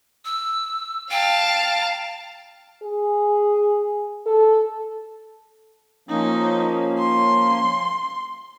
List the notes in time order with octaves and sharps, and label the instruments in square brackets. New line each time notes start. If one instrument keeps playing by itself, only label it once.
[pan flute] E6
[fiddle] F5 A5 [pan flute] G5
[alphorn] G#4
A4
[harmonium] F3 A#3 C#4 [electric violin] D#4
[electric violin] C6